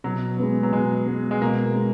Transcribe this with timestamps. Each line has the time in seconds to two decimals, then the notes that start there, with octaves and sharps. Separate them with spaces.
0.04 B2 F#3
0.39 G#3 B3
0.63 F#3
0.72 B2 G#3
1.07 G#3 B3
1.31 G#3
1.41 B2 A#3
1.76 G#3 B3